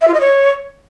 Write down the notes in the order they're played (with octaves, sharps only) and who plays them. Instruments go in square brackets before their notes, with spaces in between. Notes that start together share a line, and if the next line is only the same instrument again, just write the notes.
[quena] E5
F4
D#5
C#5